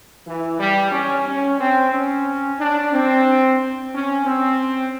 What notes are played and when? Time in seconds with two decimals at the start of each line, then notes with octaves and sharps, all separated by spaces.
0.26 E3
0.59 G3
0.92 C#4
1.26 C#4
1.60 C4
1.93 C#4
2.59 D4
2.93 C4
3.94 C#4
4.26 C4